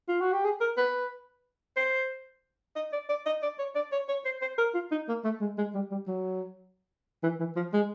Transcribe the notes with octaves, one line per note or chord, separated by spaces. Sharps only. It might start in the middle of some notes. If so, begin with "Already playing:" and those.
F4
F#4
G4
G#4
A#4
B4
C5
D#5
D5
D5
D#5
D5
C#5
D5
C#5
C#5
C5
C5
A#4
F4
D#4
A#3
A3
G#3
G#3
G3
G3
F#3
E3
E3
F3
G#3